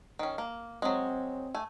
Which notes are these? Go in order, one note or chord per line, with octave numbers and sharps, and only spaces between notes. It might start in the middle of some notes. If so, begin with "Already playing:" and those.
D#3 C#4
A#3
F#3 G#3 C4
A3 G#5